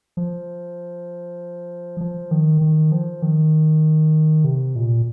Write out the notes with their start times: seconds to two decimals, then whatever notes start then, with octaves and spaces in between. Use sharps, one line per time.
0.17 F3
2.01 F3
2.31 D#3
2.61 D#3
2.92 F3
3.22 D#3
4.44 C3
4.76 A#2